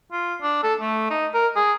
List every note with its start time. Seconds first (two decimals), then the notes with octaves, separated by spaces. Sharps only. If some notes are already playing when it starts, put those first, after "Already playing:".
0.12 F4
0.42 D4
0.63 A4
0.81 A3
1.10 D#4
1.34 A#4
1.56 G#4